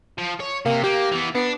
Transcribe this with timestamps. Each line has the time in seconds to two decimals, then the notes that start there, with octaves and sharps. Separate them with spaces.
0.18 F3
0.40 C#5
0.66 C3 A#3
0.83 A#3 G4
1.12 E3 B3
1.35 B3 D4